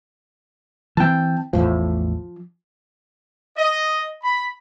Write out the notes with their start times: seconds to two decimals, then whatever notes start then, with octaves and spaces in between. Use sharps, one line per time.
0.97 E3 C4 G5 A5
1.53 A1 E2 A2 F3
3.57 D#5
4.22 B5